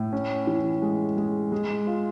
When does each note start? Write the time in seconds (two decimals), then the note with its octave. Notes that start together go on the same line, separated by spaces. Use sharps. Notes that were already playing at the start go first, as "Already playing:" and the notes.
Already playing: A2
0.13 C#4
0.47 E3
0.82 G#3
1.17 G#3
1.52 G#3
1.87 F4